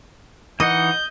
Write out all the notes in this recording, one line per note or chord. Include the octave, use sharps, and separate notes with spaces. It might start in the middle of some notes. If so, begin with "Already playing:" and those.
E3 D#4 D#5 F#5 G6